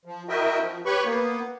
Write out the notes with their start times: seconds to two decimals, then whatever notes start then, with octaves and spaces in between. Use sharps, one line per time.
0.05 F3
0.29 E4 F#4 A#4 D#5 E5 G5
0.63 F3
0.86 G4 B4 C#5 B5 C#6
1.05 A#3 B3